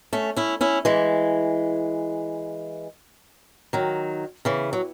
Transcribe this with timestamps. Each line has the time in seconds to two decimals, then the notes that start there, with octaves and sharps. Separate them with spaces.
0.13 A3 C#4
0.36 C#4 E4
0.61 C#4 E4
0.85 E3 G#3
3.73 D#3 F#3
4.45 C#3 E3
4.73 F#3